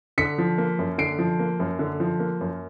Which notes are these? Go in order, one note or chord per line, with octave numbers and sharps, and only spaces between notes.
D3 B6 C#7
F3
A#3
F#2
D3 C7 D7
F3
A#3
F#2
D3
F3
A#3
F#2